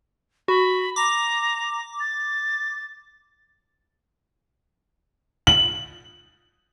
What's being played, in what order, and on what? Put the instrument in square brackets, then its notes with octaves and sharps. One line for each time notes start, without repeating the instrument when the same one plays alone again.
[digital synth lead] F#4 [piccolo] B5
[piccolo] A#5 [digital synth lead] D6
[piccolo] A6
[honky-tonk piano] F#7